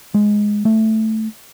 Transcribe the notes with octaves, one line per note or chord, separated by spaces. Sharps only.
G#3
A3